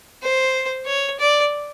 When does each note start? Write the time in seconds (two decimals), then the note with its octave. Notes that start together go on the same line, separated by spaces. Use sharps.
0.23 C5
0.86 C#5
1.19 D5